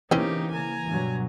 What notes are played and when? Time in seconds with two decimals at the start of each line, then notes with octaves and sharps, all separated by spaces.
0.11 C#3 E3 A#3 C4 C#4 D#4 G4
0.51 G#5 A#5
0.87 G2 B2 F#3